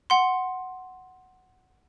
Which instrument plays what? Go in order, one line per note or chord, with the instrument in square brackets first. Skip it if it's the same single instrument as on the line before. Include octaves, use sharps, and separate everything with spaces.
[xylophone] F#5 C6